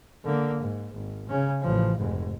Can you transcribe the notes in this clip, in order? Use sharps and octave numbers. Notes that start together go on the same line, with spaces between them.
D3 A#3
G#2
G#1
C#3 C#4
A1 F3
F1 G#2